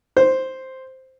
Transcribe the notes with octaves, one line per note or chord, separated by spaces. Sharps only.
C5